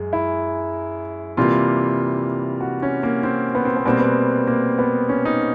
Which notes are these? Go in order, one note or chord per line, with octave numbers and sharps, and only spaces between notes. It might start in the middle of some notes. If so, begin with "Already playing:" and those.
Already playing: F#2 G#3
E4
C3 E3 G3 A#3 F4
F#4
C#4
A#3
C4
B3
C4
B3
B2 G3 A#3 C4
B3
A#3
B3
C#4
D#4